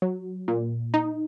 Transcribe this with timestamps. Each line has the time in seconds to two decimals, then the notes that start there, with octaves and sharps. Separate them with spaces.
0.02 F#3
0.48 A#2
0.94 D#4